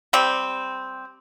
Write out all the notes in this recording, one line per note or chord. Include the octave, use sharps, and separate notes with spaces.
G3 C4